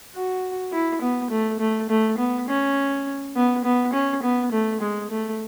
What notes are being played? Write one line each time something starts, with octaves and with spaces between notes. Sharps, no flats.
F#4
E4
B3
A3
A3
A3
B3
C#4
B3
B3
C#4
B3
A3
G#3
A3